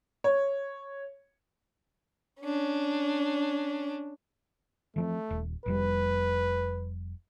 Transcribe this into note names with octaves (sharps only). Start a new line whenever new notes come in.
C#5
C#4 D4
E3 F3 A3 C4
D#1
F1 F2 G3 B4